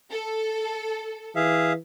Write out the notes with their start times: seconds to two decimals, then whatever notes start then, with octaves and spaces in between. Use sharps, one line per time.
0.12 A4
1.36 E3 G#4 E5 F5